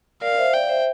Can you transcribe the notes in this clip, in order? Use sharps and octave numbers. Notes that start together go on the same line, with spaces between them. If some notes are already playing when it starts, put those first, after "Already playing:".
A#4 D5 F5
C5 E5
D5 F5 G5
C5 E5